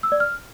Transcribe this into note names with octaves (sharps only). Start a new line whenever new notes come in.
E6
D5
F6